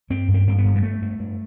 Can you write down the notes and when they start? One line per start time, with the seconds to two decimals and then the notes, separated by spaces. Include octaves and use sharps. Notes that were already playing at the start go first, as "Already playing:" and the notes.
0.10 G2 C4
0.28 G2
0.34 C4
0.47 G2 C4
0.58 B3
0.65 G2
0.76 G3
0.83 G2 A3
1.02 G2
1.19 G2